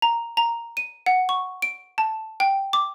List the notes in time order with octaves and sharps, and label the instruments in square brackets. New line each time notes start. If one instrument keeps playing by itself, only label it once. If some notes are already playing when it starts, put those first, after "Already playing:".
[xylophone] A#5
A#5
D#7
F#5
C#6
D7
A5
G5
D6